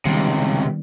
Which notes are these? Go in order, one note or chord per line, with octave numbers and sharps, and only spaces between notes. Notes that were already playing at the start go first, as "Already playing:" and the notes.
C#2 C3 D#3 G3 B3